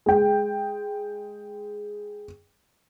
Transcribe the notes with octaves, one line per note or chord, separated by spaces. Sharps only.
G#3 G5